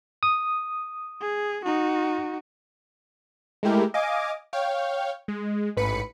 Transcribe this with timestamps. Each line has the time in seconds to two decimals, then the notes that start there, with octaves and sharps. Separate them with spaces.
0.23 D#6
1.21 G#4
1.65 D#4 F#4
3.63 G#3 A3 E4 G4 A#4
3.94 D#5 F5 G#5 D6
4.53 C#5 F5 G5
5.28 G#3
5.77 A1 G#2 B4 B5 C#7